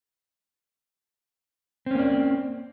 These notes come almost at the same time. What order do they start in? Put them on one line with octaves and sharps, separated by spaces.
C4 C#4 A#3 D5